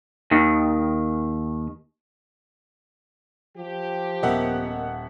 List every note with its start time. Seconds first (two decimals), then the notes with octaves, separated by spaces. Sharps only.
0.31 D#2 D#3
3.58 F3 G4
4.23 D#1 B3 A#4 D#5 E5 F#5